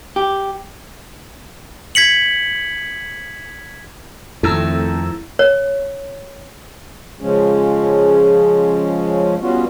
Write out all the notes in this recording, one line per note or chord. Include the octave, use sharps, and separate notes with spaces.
G4
G#6 B6 C#7 F#7
F2 D#3 A3 C4 E4 A4 A#5 E6
C#5
C#3 F3 G#3 C#4
G3 B3 C#4 F4 F#4